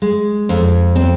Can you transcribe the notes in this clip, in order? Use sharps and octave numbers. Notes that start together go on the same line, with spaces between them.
G#3
F2
C4